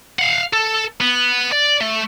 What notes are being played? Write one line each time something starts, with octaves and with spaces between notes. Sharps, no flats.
F5 F#5
A4
B3
D5
A3